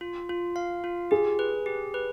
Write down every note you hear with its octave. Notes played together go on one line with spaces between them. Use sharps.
F4
F4
F5
F4
G4 G#4
B4
G4
B4